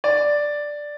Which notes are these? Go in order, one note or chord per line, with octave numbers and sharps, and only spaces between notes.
D5